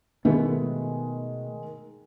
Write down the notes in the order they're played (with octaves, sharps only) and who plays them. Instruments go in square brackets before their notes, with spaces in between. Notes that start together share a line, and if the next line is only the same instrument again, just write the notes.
[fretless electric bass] B2 A3 B3 [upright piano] D#3 G#3